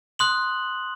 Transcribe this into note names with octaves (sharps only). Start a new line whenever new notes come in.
C6 D#6 F#6 F#7